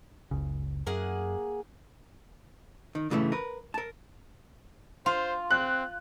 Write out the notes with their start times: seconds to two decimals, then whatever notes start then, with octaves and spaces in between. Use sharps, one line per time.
0.31 F#1 C#2 C#3
0.87 F#2 A#3 G#4 F#5
2.95 D#3
3.10 G2 C#3 E3 G#3 A3
3.32 A#4 B4
3.74 A#4 A5
5.06 F4 C5
5.51 C4 F#6